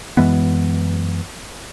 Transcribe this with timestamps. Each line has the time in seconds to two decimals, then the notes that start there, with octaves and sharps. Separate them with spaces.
0.17 F#2 E3 G#3 B3